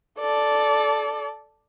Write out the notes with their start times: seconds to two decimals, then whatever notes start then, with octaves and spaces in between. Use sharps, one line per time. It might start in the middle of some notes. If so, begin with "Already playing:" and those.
0.19 A4 D5